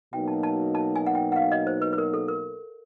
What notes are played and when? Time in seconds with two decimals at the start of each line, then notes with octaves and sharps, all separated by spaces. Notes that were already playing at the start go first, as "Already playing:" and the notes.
0.12 B2 F#3 A#3 D#4 G5
0.28 A5
0.43 A5
0.75 A5
0.96 G#5
1.07 F#5
1.15 G5
1.32 F#5
1.36 F5
1.52 D#5
1.67 C5
1.82 B4
1.93 B4
1.98 A#4
2.14 A4
2.28 A#4